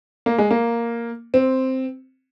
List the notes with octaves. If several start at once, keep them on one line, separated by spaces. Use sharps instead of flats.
A#3
G#3
A#3
C4